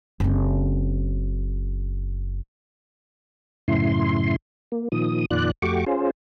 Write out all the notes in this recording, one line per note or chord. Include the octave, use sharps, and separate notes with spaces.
F#1 C4
F#2 A2 C#3 E4 C6
A#3
A#2 D#3 F3 D#6
F2 A#2 D#3 F4 D5 F#6
F2 A3 F#4 G4 C#6 D6
C#4 F4 G#4 C5